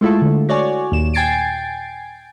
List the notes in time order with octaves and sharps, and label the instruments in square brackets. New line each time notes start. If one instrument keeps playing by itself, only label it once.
[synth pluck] G#3 A3 E4 F4 A4
D3
F#4 C#5 D5 G#5
D#2 A#2 E7
G5 G#5 G#6 A6 C7 D7